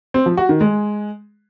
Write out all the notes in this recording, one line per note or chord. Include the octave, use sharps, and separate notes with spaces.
C4
F3
F#4
D#3
G#3